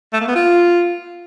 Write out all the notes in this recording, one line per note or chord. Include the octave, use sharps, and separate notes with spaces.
A3
A#3
B3
F4